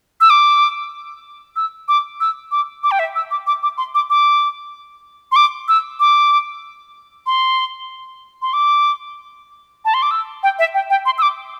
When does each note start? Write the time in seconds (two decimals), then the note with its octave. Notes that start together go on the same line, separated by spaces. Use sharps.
0.21 E6
0.30 D6
1.56 E6
1.88 D6
2.20 E6
2.51 D6
2.83 D6
2.91 G5
2.99 E5
3.15 E6
3.31 D6
3.47 D6
3.63 D6
3.78 C6
3.95 D6
4.10 D6
5.32 C6
5.36 D6
5.68 E6
6.00 D6
7.26 C6
8.42 C6
8.53 D6
9.85 A5
9.94 C6
10.02 D6
10.11 E6
10.43 G5
10.59 E5
10.74 G5
10.90 G5
11.06 C6
11.18 E6
11.22 D6